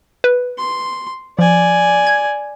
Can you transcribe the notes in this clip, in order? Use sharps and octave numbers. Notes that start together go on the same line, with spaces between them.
B4
C6
F3 D5 G#5
G#6